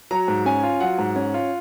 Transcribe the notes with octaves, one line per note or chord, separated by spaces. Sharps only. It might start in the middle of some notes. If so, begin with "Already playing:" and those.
F#3 A#5
G#2
C#4 G#5
F4
F#3 F#5
G#2
C#4
F4